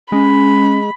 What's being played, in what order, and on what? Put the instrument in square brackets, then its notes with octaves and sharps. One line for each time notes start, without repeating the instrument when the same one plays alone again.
[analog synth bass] G#3 [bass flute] C#4 [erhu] B5